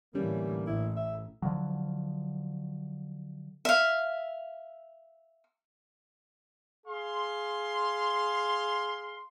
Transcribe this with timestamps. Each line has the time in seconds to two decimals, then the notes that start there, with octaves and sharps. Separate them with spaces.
0.15 A2 D3 E3 G3 A#3 C#4
0.67 A1 E4
0.97 E5
1.42 D3 F3 F#3
3.65 E5 F5
6.87 G#4 F5 C6